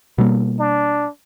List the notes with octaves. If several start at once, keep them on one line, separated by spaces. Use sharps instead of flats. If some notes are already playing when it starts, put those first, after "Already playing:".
B2 G3 A#3
D4